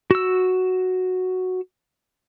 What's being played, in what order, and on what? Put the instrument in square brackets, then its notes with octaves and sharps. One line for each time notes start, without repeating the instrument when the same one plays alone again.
[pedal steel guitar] F#4 E6